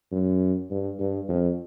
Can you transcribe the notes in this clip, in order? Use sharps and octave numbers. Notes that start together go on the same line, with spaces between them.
F#2
G2
G2
F2